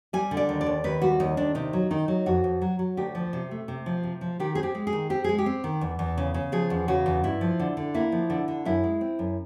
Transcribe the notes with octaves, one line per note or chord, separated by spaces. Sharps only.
G3 G#5
D3
D5
D#2
D5
D#2
D#2 B4
G3 F#4
D#2 D#4
D#2 D4
C3 D#4
F#3
D#3 D#4
F#3
F2 F#4
F2
F#3
F#3
D2 G4
F3
C3
A3
C3
F3
C3
F3
D#3 G4
C4 G#4
G4
G#3
G#4
D#3
C4 G4
G#3 G#4
G4
C4
D#3
E2
E2
C#3
C#3
F3 G#4
E2
C#3 F#4
E2
G2 E4
F3
D3
D3
A#3 E4
F3
D3
D3
F#2 E4
G#3
C4
F#2